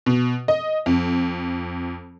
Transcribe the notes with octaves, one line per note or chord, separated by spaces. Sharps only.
B2
D#5
F2